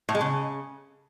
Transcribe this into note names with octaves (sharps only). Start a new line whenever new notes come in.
A2
G#3
C#3